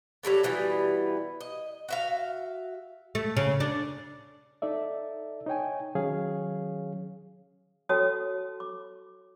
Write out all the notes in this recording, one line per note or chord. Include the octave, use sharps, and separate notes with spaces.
F#3 G3 A3 B3
B2 E3 G3 B3
D#5
F#4 E5 F5
A3
C#3
D4
D#4 A4 D5 E5
D#4 C#5 G5 G#5
D#3 F#3 C#4 G#4 C#5 F5
F#4 A4 C#5 G5 A5 D#6
D6